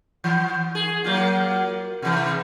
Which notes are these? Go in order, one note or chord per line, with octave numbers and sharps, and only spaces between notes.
E3
G#4
F#3 A#3 F4
C3 E3